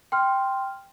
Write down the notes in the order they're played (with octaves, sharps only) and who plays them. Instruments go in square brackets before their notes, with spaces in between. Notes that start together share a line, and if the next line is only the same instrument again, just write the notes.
[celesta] G5 C6 F6